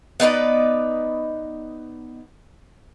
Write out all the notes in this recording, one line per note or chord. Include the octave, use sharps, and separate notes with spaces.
B3 D#4 B4 D5